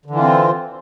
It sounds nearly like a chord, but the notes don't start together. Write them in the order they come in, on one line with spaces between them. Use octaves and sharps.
D3 E3 F4 C4